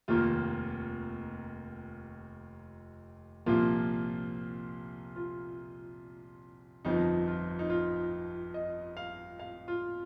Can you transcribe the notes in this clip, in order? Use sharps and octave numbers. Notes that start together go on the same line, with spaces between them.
F1 D#2 D#3 A#3 F4
C2 A#2 F3 A#3 F4
F4
G1 F2 F3 D#4
F4
D#4
F4
D#5
F5
F5
F4